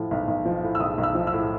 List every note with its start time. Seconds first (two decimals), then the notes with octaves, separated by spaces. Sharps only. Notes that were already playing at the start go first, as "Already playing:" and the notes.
Already playing: A2 F3
0.11 B1
0.28 B1
0.46 F3
0.63 A2
0.75 E6
0.80 B1 D#6
0.98 B1
1.03 E6
1.15 F3
1.27 E6
1.33 A2